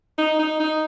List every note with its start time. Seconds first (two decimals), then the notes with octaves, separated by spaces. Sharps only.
0.18 D#4
0.39 D#4
0.60 D#4